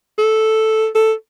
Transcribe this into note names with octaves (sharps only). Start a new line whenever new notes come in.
A4
A4